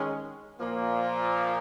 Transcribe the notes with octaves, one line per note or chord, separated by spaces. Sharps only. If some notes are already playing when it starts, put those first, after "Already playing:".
Already playing: D#3 G#3 C#4
A#2 F3 A#3